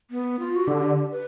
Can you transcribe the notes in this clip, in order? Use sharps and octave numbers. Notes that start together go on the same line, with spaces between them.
B3
F4
F#4
D3 G4
B4